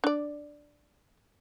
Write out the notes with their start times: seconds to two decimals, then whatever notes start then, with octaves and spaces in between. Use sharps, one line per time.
0.04 D4 D5